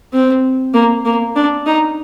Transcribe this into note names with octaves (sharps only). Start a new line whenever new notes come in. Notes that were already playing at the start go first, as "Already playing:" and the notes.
C4
A#3
A#3
D4
D#4